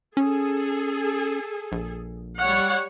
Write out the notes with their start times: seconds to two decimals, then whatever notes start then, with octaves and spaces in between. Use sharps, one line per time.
0.17 C#4 G#4 A4
1.72 A#1
2.40 G3 C#5 F#5